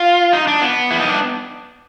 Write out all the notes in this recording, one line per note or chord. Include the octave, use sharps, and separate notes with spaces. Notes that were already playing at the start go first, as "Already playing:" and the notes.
Already playing: F4
D#4
D4
B3
E4
D#4
D4